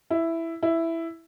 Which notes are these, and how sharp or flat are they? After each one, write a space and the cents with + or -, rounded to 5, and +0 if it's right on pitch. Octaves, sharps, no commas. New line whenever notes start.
E4 +5
E4 +5